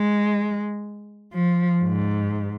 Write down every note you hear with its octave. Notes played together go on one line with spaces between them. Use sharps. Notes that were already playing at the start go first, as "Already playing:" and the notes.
Already playing: G#3
F3
G#2